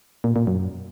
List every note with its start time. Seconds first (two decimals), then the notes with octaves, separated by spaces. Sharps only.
0.24 A#2
0.36 A#2
0.47 F#2